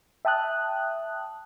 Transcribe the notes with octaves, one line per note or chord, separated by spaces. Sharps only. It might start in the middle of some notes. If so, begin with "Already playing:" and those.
E5 G5 A5 D#6 F#6